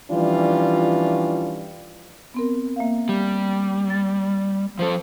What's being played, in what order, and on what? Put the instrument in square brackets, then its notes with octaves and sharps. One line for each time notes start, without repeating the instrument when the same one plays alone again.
[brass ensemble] E3 F3 G3 C#4 D4 F4
[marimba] B3 C4 A#4
A#3 E5 F5
[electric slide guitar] G3
[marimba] A6
[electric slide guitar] F3 F4 A4 [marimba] C5